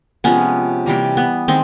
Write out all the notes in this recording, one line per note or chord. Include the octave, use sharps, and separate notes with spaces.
C3 F3 G#3 B3 C#4
C3 E3 G3 A#3
B3
D#3 G#3 C4